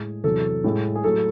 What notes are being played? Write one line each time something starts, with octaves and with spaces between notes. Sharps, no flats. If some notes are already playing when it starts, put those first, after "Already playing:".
Already playing: A2 G#3 G#4
E2 C3 F#3 A4
A2 G#3
G#4
A2 F#3 A3 A4